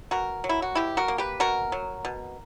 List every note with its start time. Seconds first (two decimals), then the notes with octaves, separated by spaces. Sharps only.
0.11 B2 F#4 A#4
0.44 F#3
0.49 E4
0.62 F#4
0.75 B2 E4 G4
0.97 F#4 A#4
1.08 A#3
1.18 G4 B4
1.40 B2 F#4 A#4
1.72 F#3
2.05 B2